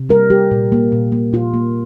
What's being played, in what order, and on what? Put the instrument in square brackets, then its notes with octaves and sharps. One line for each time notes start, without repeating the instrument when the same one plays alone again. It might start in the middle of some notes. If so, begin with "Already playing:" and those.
Already playing: [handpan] C3
G3 A#4
G3 G4
A#2
A#3
A#2
A#3
A#2 F4
A#3